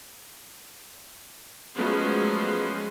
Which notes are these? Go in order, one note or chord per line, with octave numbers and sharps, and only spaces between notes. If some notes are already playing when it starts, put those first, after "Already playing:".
F3 F#3 G#3 A3 B3 C#4